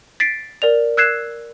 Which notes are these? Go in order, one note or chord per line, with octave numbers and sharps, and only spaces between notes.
A6 B6 C7 D7
A#4 D5 F7
E6 F#6 G#6 C7 E7